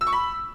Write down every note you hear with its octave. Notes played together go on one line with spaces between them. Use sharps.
E6
C#6
B5